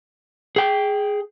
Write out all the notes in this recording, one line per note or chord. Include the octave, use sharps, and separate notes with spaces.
G#4 G5